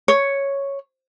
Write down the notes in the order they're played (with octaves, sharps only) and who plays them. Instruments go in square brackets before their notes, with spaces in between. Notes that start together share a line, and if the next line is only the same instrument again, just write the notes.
[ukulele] C#5